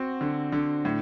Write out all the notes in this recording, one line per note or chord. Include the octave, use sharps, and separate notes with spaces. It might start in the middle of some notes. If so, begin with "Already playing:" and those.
Already playing: C4 F#4
D3
D3
A2